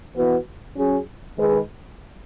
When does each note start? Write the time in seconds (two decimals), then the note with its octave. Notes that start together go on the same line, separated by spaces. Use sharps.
0.16 E3 B3 F#4 B4
0.76 F#3 C#4 G#4
1.38 D#3 G#3 D#4 G#4 B4